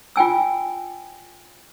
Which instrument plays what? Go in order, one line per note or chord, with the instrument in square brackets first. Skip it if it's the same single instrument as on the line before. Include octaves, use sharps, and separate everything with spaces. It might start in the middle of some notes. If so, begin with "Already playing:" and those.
[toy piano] F4 G5 G#5 E6